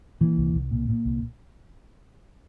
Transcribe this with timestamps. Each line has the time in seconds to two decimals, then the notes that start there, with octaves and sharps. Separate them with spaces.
0.21 A#2 E3
0.38 C2
0.55 C2
0.71 A#2
0.89 A#2
1.05 C2